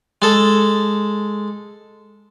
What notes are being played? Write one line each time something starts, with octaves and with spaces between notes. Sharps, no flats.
G#3 A4